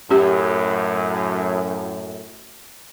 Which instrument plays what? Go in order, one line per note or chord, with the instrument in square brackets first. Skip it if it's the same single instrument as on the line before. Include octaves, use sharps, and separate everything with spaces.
[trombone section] F#2 A2 [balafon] C#4 G4